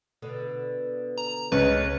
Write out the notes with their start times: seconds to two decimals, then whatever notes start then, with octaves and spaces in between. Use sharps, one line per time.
0.22 B2 D3 B3
1.18 A#5
1.52 C#2 C#4 B4 C#5